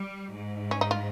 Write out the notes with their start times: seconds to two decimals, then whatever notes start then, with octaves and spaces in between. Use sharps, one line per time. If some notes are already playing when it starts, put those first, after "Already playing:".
Already playing: G3
0.33 G#2
0.71 C#4
0.81 D#4
0.91 F4